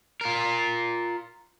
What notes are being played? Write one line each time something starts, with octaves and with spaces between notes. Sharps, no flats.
F4 A#4